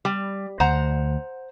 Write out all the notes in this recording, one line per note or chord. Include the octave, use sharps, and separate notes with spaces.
G3
D2 C5 F#5 A#5